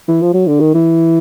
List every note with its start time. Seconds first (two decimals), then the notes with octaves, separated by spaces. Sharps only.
0.08 E3
0.22 F3
0.34 F#3
0.47 D3
0.60 D#3
0.74 E3